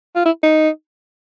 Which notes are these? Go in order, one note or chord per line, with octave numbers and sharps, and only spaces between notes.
F4
E4
D#4